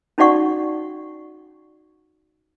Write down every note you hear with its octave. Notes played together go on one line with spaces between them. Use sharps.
C#4 D#4 F#4 D5 F#5 C#6